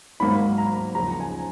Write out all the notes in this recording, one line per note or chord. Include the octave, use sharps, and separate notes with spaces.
G#2 D#3 F#3 A#3 B5
A#5
D#2 C#3 F3 A#5
G#5